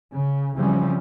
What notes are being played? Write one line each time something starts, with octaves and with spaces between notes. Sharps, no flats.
C#3
C#3 E3 F3 G3 C4 C#4